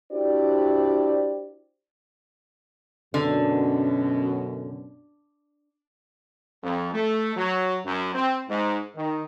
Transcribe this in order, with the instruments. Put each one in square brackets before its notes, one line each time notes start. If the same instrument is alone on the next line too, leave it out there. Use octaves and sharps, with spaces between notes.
[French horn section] D4 E4 F#4 G4 C5 D5
[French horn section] F#2 B2 [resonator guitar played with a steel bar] D3
[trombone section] F2
A3
F#3
F#2
C4
G#2
D#3